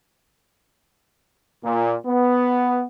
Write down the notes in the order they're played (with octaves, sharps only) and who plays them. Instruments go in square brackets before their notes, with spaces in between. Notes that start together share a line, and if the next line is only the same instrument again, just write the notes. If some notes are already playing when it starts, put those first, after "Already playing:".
[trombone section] A#2
B3